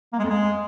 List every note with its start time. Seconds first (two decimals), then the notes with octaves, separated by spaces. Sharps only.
0.13 A#3
0.18 G#3
0.24 F2
0.30 G#3